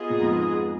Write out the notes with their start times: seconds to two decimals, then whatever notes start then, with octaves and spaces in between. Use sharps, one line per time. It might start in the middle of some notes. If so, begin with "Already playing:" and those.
Already playing: B3 F4 G#4 D#5
0.10 A#2
0.21 F2 G#2